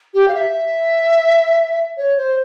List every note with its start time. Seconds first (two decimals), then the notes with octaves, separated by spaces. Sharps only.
0.14 G4
0.28 F5
0.35 E5
1.97 C#5
2.17 C5